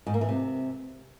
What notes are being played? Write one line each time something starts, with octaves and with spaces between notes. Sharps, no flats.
G#2
A#3
E3
C3